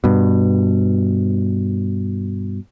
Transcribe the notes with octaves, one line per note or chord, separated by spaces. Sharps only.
G2 B2